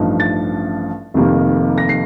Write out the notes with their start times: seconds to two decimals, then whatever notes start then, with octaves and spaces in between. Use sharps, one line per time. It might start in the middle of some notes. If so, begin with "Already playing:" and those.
Already playing: A1 G2 F3 A3 D#4
0.20 A6
1.14 F1 F2 C3 D#3 A#3
1.78 A#6
1.89 C7